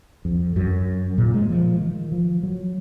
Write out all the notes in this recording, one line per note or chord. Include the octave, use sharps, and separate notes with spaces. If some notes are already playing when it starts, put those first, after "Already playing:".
F2
F#2
A#2
G#3
F3
D#3
F3
F#3